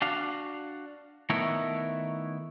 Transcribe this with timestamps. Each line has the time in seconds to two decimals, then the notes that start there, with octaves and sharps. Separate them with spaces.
0.02 D4 F#4 F5
1.30 D#3 A3 B3 E4 A#4 C#5